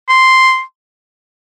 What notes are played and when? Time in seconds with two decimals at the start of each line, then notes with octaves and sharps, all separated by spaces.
0.09 C6